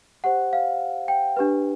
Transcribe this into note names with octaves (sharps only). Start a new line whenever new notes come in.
G4 C5 F#5
F5
G5
D4 G4 B4